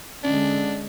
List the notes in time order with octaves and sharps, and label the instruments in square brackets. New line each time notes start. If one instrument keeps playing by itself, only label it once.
[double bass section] D3 G#3 [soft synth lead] C#4 [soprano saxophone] D4